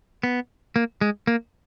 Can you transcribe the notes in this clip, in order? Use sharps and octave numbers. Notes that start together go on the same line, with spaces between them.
B3
A#3
G#3
A#3